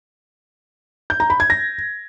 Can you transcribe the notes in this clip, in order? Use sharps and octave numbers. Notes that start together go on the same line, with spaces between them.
G6
A#5
B5
G#6
A#6